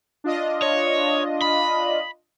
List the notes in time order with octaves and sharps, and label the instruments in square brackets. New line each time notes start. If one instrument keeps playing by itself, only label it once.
[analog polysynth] D4 F4 D#5
[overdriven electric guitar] C#5
B5